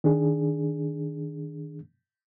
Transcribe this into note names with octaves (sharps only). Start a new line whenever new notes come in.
D#3 D4 G#4